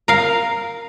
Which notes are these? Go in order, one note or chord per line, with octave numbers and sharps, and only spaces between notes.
A#4 F5